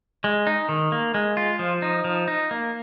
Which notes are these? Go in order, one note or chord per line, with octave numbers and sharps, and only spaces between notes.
G#3
D#4
D#3
A#3
G#3
F4
F3
D#4
F3
D#4
A#3